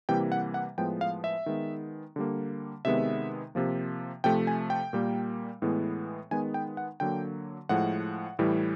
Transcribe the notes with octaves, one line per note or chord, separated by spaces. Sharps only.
C3 E3 G3 A#3 G5
F#5
F#5
A2 F3 G#3 B3 G5
F5
E5
D#3 G#3 B3
D3 G3 A#3
C3 D#3 G#3 B3 E5
C3 F3 A#3
C3 F3 A3 G5
G#5
G5
A#2 G3 A#3
A2 E3 G#3 B3
D#3 G#3 B3 G#5
G5
F#5
D3 F#3 A#3 G5
A2 F3 G#3 F#5
A2 E3 G3